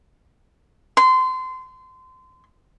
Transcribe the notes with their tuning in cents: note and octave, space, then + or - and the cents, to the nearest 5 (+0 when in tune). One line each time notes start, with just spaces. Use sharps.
C6 -25